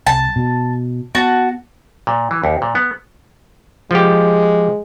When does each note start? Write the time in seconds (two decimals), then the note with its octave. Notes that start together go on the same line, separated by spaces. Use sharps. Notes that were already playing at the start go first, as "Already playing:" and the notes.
0.07 C2 A5
0.36 B2
1.15 B3 F#4 A5
2.07 A#2
2.31 E3
2.44 D#2
2.62 A#2
2.75 B3
3.91 F3 G#3 G4